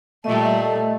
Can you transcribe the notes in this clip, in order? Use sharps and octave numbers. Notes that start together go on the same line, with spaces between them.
A#2 G3 A3 D#5 A5